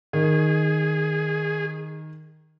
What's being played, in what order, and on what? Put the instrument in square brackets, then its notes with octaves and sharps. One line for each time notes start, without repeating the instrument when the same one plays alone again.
[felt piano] D#3 [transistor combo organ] G#4